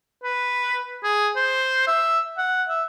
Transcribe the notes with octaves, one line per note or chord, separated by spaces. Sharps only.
B4
G#4
C5
E5
F#5
E5